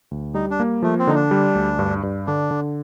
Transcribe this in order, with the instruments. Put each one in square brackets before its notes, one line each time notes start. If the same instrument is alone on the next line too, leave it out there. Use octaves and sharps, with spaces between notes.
[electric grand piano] D2
[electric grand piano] G3 [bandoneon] D#4
[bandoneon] D4
[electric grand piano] A#3
[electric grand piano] F3 [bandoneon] A3
[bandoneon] C4
[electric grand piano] D3 [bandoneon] D#4
[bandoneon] D4
[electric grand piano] G3
D2
G2
G2
[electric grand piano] D3 [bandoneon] D4
[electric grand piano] D3